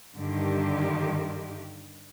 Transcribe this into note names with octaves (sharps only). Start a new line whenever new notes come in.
G2 D3 D#3 G4